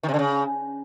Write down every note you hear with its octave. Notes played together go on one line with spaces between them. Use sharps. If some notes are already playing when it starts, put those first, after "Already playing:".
D#3
C3
D3
C#3